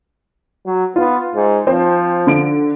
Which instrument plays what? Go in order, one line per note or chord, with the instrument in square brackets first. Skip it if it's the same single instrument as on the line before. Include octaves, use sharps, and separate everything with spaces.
[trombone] F#3
[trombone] B3 [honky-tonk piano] F4
[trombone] G#2
[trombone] F3 [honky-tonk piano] C4
[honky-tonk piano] D3 D7